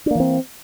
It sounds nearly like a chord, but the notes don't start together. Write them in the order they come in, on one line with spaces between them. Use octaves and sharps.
D4 A#3 E3 C4